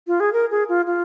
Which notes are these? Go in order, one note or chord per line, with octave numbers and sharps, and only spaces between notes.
F4
G#4
A#4
G#4
F4
F4